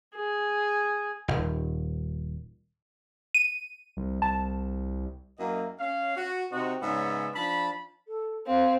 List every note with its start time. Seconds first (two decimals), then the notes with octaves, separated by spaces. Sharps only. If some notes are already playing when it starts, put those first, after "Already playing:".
0.16 G#4
1.28 D#1 G#1
3.35 D#7
3.97 C2
4.22 C2 A5
5.39 F#2 A#3 E4 D#5
5.80 C#4 F5
6.16 F#4
6.52 C3 C4 D#4 F#4
6.82 G#2 C#3 B3 C#4 D5 E5
7.35 F3 D4 A5 B5
8.07 A4
8.47 C4 F5